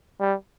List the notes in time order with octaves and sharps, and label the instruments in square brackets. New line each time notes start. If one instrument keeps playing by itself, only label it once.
[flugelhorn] G3